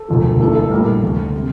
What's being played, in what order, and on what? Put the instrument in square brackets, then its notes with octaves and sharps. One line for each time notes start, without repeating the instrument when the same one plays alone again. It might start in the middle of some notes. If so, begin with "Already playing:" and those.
Already playing: [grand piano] A4
E1 D2 D3 F3
A1 G2 E3 A#3 A4
A4
A#1 A2 G3 A#3 A#4
D2 D3 A3
C3 G3